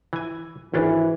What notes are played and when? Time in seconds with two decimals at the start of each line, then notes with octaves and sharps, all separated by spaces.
0.13 E3 G#5
0.74 G#1 E3 C#4 D4